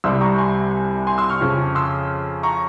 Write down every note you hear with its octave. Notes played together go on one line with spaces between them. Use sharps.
C2 C3 G3 C6 E6
A#5 C#6
G#5 C6
G#5 C6
C6 E6
C#6 F6
F2 C#3 F3
C6 E6
A#5 C#6